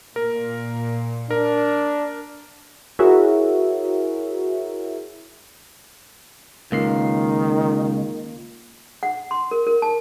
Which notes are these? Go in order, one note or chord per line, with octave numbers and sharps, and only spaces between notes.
A#2 A#4
D4 A#4
E4 F#4 G#4 A#4 C#5 E5
C#2 D#3 A#3 F4 C7
F#5
C6
A#4
A#4
A5